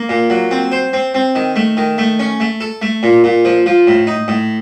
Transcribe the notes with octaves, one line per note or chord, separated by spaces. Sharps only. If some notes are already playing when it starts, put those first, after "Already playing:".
Already playing: A#3
A#2
F#3
C4
C5
C4
C4
D#3
A3
D#3
A3
C#4
A3
A4
A3
A#2
A#2
F3
F3
A2
D#4
A2